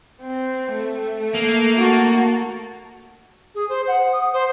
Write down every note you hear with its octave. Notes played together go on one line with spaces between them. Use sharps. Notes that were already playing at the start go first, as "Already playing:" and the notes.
C4
A3
A#3
F#4 A5
G#4
C5
F#5
D#6
C5